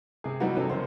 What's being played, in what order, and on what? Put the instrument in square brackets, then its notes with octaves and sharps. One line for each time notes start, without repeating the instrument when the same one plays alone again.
[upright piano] C3 G#4
E3 F#3 G3 B3 D#4 F#4
C3 C#4 D#4 A4
F#1 F#2 C5